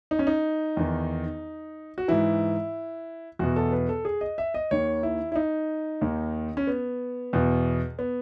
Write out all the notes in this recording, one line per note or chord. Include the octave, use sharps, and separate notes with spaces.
D#4
C#4
D#4
E2 D#3
F#4
G#2 E3 E4
E2 B2 F#4
A4
B4
A4
G#4
D#5
E5
D#5
D#2 D#3 C#5
E4
E4
D#4
D#2 D#3
C#4
B3
E2 B2
B3